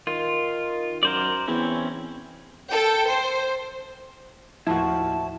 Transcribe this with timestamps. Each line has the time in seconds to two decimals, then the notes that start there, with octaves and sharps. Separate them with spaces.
0.07 D#3 F4
1.03 F#2 A#4 C5 D5
1.48 E2 C4 C#4 E4
2.70 A4 G5
3.07 C5
4.67 D#2 A2 F3 E4 F#4 A5